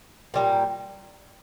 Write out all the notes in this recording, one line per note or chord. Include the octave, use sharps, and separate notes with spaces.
A#2 G3 A#3